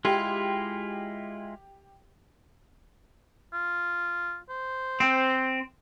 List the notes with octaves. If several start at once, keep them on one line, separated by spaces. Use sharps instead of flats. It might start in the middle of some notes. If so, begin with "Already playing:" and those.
G#3 E4 F4 G4
F4
C5
C4